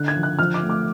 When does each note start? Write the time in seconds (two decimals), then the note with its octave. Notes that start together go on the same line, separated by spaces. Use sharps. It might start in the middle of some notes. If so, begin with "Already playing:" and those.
Already playing: D3 F#6
0.08 G#6
0.16 F3
0.23 F#6
0.39 F3 F6
0.54 D6
0.63 A3
0.70 D6